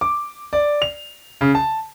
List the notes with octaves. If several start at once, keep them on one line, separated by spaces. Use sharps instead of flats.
D6
D5
F7
C#3
A5